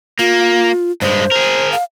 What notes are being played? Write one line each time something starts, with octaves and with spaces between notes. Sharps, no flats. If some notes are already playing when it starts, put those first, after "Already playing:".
A#3 F4
G2 G#3 C5
G#4 A#4
F5